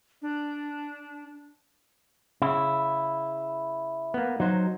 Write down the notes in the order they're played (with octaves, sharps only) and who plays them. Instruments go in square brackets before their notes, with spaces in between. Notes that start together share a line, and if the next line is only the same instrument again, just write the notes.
[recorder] D4
[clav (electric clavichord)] C#3 [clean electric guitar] E4
[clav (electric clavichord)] A#3 B3
[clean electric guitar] F#3 [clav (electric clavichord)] D#4 C5